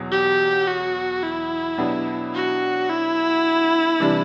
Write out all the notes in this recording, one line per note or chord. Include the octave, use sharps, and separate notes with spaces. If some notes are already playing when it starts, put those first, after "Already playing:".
Already playing: E2 B2 F#3
G4
F#4
E4
B2 F#3 B3 D4 G4
F#4
E4
C3 E3 G3 D4